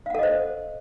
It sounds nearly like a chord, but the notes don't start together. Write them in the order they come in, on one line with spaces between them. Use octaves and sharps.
F5 F#5 A4 D#5 C5